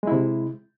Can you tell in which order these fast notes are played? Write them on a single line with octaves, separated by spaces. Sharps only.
G#3 E4 C3